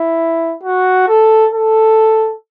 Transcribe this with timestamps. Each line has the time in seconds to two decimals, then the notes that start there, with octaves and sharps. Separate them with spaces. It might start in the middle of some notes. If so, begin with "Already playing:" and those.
Already playing: E4
0.63 F#4
1.08 A4
1.53 A4